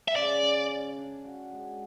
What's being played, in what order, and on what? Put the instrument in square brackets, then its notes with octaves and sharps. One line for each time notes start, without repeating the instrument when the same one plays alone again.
[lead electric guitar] E5
[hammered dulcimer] C#3 [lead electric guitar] D5
[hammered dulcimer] C#4
C#4
D4
F#4
G#3